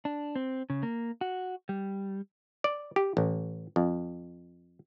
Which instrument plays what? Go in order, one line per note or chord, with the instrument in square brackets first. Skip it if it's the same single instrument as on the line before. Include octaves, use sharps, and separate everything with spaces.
[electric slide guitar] D4
C4
C#3
A#3
F#4
G3
[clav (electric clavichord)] D5
G4
A1
F2